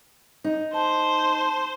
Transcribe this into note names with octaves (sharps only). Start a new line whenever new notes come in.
D#4
C5 A5